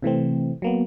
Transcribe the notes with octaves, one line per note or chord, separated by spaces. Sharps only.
C3 E3 A3 C4
F#3 A#3 B3